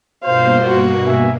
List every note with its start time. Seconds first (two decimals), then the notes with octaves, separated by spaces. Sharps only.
0.24 G2 B2 A#3 F4 C5 F5
0.67 F#4
1.07 E5 G#5